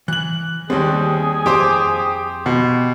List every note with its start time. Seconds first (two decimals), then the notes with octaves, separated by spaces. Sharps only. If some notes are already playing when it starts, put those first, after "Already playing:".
0.08 E3 F#6 F#7
0.70 D#2 G3 C4 G#4 C#5 C6
1.46 F2 G4 C5 D6
2.46 B2